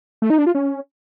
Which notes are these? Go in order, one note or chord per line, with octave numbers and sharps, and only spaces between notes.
A3
D#4
D4
F4
C#4